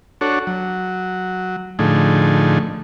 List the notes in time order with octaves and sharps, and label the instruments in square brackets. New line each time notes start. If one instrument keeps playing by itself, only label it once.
[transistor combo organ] D4 F#4 A4 C#5
F#3
A2 D3 F3 A3 D#4 G#4